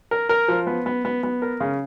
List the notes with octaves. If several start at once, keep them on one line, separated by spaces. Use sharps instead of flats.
A#4
A#4
F3
B3
B3
B3
B3
A#4
C#3